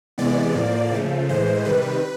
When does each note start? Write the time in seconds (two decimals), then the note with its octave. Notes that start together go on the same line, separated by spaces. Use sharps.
0.18 C3 E3 G#3 B3 D5
0.55 A2 F3 A#3
0.91 C#3 F3 A3
1.29 A2 E3 G#3 C5
1.65 C3 D#3 G3 B4